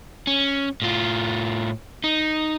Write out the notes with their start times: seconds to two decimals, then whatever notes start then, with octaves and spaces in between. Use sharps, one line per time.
0.27 C#4
0.82 A2 F4
2.04 D#4